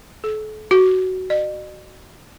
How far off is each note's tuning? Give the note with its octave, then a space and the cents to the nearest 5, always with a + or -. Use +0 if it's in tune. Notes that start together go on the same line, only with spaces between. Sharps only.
A4 -40
F#4 +15
D#5 -45